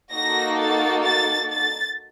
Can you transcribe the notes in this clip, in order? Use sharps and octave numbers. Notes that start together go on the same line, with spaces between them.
A#3 D#4 F#4 A4 A#6
A6
A6
A6